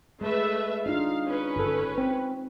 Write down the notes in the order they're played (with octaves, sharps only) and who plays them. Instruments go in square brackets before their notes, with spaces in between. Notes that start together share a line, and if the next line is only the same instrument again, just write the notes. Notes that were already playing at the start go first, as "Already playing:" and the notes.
[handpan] G#3 [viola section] A3 B4 E5
[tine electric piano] D4 [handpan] D#4 F4 [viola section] F5
[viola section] C#4 B4
[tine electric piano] G1 A4
C4